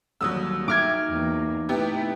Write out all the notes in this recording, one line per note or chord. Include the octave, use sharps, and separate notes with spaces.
D#2 D3 F#3 G3 D#6 E6
D#4 E5 G5 D6 F6 G#6
E2 A#3
C3 A3 B3 E4 G4